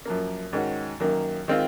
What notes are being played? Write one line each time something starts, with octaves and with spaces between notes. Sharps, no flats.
F#2 F3 A#3
G#2 D#3 G#3 C#4 F#4
F#2 D#3 A#3
D#3 G#3 C4 F4